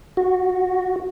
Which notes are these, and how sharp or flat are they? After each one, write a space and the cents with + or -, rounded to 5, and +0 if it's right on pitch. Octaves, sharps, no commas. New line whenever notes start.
F#4 -10